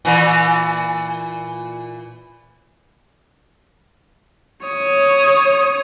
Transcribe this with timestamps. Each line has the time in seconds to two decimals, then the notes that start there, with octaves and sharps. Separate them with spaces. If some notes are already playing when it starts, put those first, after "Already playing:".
0.05 A#2 E3
4.67 C#5 D#6